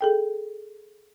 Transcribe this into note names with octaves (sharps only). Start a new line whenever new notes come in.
G#4 A4 G5